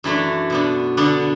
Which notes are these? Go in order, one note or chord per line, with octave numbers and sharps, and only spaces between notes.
F#2 E3 A3 D4
B2 B3 D4
D3 B3 D4